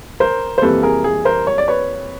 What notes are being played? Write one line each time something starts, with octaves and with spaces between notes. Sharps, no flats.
A#4 C5
C5
F2 C3 E3 G3 A#3 A4 B4
G#4 A#4
G#4
A#4 C5
C#5
D5
B4 C#5